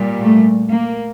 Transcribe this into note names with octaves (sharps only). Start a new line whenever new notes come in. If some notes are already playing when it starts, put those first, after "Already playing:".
Already playing: A#2 G3
A3
A#3